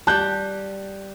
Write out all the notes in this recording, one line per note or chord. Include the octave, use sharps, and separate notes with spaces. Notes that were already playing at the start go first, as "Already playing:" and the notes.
G3 G4 A5 F#6 G6